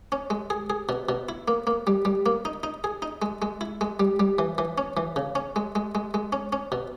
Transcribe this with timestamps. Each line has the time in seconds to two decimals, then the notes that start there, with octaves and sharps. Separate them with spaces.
0.12 C#4
0.30 G#3
0.50 G#4
0.70 G#4
0.89 B2
1.09 B2
1.29 E4
1.48 A#3
1.67 A#3
1.87 G3
2.05 G3
2.26 A#3
2.45 D#4
2.63 D#4
2.84 G#4
3.02 D#4
3.22 G#3
3.42 G#3
3.61 E4
3.81 G#3
4.00 G3
4.20 G3
4.39 E3
4.58 E3
4.78 C#4
4.97 E3
5.16 C#3
5.35 C#4
5.56 G#3
5.75 G#3
5.95 G#3
6.14 G#3
6.33 C#4
6.53 C#4
6.72 B2